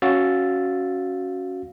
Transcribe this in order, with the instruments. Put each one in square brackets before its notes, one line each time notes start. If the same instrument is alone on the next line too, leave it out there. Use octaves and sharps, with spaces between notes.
[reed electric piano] C#4 F#4 F5 E6 A6